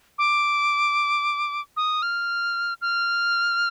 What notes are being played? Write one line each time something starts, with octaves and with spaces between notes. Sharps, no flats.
D6
D#6
F6
F6